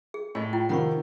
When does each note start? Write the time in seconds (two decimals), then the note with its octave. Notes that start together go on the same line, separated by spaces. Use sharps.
0.14 G#4
0.35 A2 D#5 G#5
0.53 E4 F4 G5
0.69 C3 D#3 F3 F#5 B5 C#6